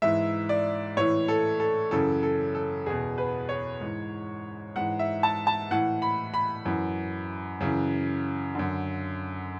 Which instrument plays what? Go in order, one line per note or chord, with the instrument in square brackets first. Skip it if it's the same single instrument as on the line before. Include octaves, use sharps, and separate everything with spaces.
[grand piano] G#2 E3 E5
D5
A2 E3 C#5
A4
A4
F#2 C#3 E3 A4
A4
A4
E2 B2 G#4
B4
C#5
G#2 E3
G#2 E3 F#5
E5
A5
A5
A2 E3 F#5
B5
B5
F#2 E3
F#2 C#3 E3
F#2 D3